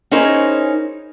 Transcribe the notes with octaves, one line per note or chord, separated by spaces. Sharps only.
C#4 D#4 E4 G#4 A#4 C5